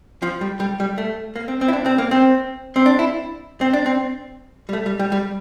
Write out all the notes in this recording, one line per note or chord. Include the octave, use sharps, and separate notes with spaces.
F3
G3
G3
G3
A3
A#3
C4
C4
E4
D4
C4
A#3
C4
C4
D4
E4
C4
D4
C4
G3
A3
G3
G3
G3